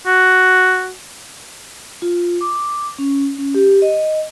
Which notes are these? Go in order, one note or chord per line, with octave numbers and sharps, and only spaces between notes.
F#4
F4
D6
C#4
C#4
G4
D#5